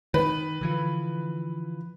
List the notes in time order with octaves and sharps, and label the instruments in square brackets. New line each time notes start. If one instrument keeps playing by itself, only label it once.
[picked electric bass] D#3 [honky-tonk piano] B4
[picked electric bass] D3 E3 F3